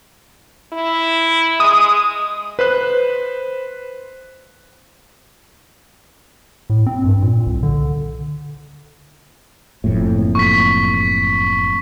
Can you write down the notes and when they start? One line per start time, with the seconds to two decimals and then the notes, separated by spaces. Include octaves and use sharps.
0.73 E4
1.60 G#3 D#6
2.59 B4 C5 F#6
6.70 A2
6.86 C4
7.05 G2
7.22 A#2
7.47 C2
7.63 D3
9.84 F#1 F2 A2
10.35 C#6 B6